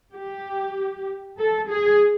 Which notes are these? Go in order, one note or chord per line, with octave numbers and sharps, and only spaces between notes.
G4
A4
G#4